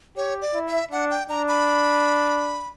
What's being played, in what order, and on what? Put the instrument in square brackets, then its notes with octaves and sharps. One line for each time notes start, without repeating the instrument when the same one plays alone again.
[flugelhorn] G4 [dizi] C#5
[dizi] D5
[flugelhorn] E4
[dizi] E5
[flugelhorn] D4 [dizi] F#5
[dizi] G5
[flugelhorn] D4 [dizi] A#5
[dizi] B5